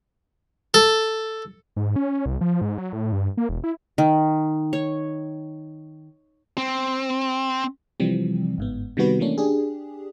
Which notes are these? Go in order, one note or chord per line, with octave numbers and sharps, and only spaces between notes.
A4
G#2
C#4
C2
F3
G#2
F#3
A2
G2
A#3
E1
E4
D#3
C#5
C4
C3 E3 F3 G3 C4
G1 G#2 B3
C3 D#3 G3 B3 F#4 B4
E3 A3 A#3 C#4 D4
D4 G4 G#4